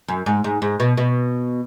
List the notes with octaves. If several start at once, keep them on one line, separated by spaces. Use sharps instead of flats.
F#2
G#2
G#2
G#2
B2
B2